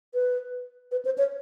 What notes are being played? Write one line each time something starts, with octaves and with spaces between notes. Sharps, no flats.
B4
B4
C5
C#5